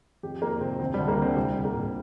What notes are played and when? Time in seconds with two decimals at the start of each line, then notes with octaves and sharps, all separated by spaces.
0.23 F2 G4
0.42 F2 A#3
0.61 C3 C4
0.80 D2 C4
0.94 G3
0.99 D2
1.08 A#3
1.17 D3 C4
1.36 C2 G3
1.55 C2
1.65 A#3
1.74 A#2